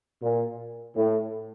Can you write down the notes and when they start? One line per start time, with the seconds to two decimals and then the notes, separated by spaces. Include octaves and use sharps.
0.21 A#2
0.95 A2